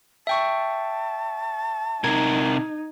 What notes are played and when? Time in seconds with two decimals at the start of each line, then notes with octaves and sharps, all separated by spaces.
0.27 E5 G5 A5 C#6
2.04 C3 D#4 A#4 G#6